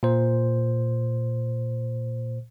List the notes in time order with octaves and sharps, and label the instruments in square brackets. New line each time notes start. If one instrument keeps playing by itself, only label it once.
[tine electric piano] A#2 C5